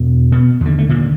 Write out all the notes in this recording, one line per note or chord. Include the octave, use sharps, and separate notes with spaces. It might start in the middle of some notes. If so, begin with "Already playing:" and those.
Already playing: E2 B2
B2 B3
D#2 D3
A3
A#2 A#3